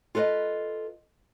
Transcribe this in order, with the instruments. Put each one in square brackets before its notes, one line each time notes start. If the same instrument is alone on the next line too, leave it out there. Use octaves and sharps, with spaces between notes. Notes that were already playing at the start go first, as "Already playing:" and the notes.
[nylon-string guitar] F4 A4 B4 D5 D#5